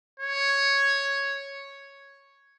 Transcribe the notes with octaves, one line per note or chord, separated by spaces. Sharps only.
C#5